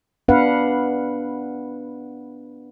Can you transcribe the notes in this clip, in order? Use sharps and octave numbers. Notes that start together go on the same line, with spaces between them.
B3 D4 B4 F5 F#5